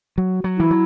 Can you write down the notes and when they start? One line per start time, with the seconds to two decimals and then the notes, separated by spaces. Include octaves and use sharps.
0.18 F#3
0.44 F#3
0.57 E3 E4
0.71 F#3